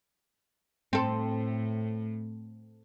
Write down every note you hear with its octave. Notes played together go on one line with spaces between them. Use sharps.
A2 C4 A4